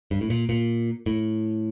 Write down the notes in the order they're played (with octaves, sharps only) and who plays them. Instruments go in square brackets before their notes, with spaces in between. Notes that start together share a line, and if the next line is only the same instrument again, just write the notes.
[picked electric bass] G2
A2
A#2
A#2
A2